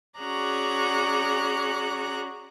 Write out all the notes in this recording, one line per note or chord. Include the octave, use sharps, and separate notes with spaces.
C#4 F#4 G#4 D5 A#5 F#6